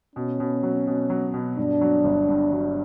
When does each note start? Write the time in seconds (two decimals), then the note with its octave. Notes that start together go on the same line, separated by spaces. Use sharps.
0.16 B2 C#4
0.40 B2
0.63 F#3
0.87 B2
1.10 F#3
1.34 B2
1.58 G2 D4
1.81 F#3
2.04 G1
2.29 G2
2.52 F#3